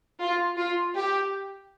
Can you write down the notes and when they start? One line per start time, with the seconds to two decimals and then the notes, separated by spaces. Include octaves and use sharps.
0.20 F4
0.56 F4
0.94 G4